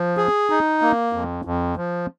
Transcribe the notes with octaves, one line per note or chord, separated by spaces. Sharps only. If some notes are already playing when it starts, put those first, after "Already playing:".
Already playing: F3
G#4
D#4
A#3
F2
F2
F3